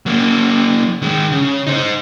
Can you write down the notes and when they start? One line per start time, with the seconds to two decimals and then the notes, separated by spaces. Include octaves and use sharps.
0.06 F#3 A#3
1.02 D#3 G#3
1.32 C#3
1.67 D#4 C5